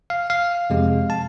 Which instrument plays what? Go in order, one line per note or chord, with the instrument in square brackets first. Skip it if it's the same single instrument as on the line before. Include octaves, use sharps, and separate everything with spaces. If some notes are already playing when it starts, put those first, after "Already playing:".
[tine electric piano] F5
F5
F2 C3 G#3
A5